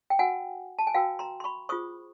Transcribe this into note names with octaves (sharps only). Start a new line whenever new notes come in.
G5
F#4 B4 F#5 G#5
A5
G#5
F#4 B4 F5 G5
A#5 C6
C6
B5 C#6
F4 G#4 C5 C#6 D#6